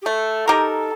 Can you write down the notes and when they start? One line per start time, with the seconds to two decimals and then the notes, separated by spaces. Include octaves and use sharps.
0.02 G4
0.05 A3 A4
0.47 D#4 G4 A#4